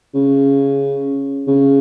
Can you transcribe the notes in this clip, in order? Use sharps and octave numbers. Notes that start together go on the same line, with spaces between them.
C#3
C#3